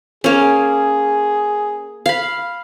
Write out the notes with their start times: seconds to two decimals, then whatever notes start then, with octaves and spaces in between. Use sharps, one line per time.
0.24 A#3 C#4 G#4
2.06 F5 B5